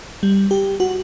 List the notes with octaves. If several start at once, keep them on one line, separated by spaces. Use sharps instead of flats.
G3
G4
F#4